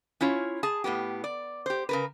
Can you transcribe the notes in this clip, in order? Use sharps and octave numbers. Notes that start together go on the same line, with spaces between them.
C#4 E4 F4 C#5
G#4 A5
A2 C#3 B3 G4
D5
G4 C5
C#3 A#4 B4